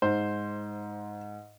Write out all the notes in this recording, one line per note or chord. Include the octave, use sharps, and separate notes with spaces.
G#2 C5